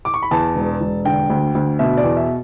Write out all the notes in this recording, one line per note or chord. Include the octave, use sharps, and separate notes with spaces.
D6
C#6
B5
E2 A5
E1
E1
D3 G5
D2
D2
B2 E5
D5
E2
E5